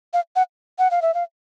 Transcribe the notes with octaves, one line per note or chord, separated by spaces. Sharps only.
F5
F#5
F#5
F5
E5
F5